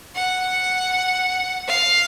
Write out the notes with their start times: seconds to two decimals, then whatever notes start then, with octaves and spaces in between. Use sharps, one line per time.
0.15 F#5
1.67 F5